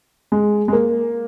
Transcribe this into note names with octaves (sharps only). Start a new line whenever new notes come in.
G#3
G#3
A#3